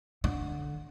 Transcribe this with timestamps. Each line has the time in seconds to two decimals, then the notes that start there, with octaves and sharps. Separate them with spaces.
0.24 D3